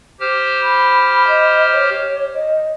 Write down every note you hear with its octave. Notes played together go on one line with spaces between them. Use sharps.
G4 C5 F6
B5
D#5
C#5
D#5